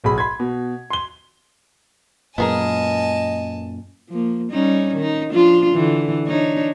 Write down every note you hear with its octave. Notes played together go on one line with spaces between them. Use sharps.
D1 B1 G#4 B5
B5 C6 G#6
B2
C6 G7
F#2 A#2 B3 G#4 A#4 D#5 G#5 A5
F3 A#3
G3 C#4 D#4
D#3 D#4
F3 D4 F4
D3 E3
D4 D#4 C#5